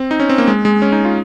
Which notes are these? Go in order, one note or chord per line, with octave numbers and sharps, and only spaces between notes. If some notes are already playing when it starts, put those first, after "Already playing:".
Already playing: C4
D#4
C#4
C4
A#3
G#3
G#3
C#4
D#4
F4